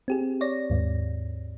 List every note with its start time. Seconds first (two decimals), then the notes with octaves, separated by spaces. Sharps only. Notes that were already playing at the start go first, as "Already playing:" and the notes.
0.08 C4 G4 G#4
0.41 C#5 D5 A#6
0.70 D#2 G#2